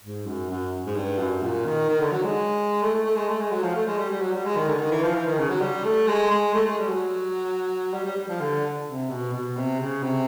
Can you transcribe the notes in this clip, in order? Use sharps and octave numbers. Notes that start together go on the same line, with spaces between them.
G#2
F#2
F#2
G#2
G2
F#2
A#2
D#3
D#3
D3
F#3
G#3
A3
A3
A3
G#3
A3
G#3
F#3
F3
A3
G#3
G3
G3
F#3
G3
G#3
D#3
D3
D#3
E3
F3
E3
D#3
C#3
F#3
G3
A3
G#3
G#3
A3
G#3
G3
F#3
G3
G3
G3
F3
D3
C3
B2
B2
C3
C#3
C3